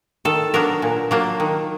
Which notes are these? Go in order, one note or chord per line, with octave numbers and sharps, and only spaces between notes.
D#3 A4
F#3 B3 D4 A#4
A#2
F#3 A#3 D4
D#3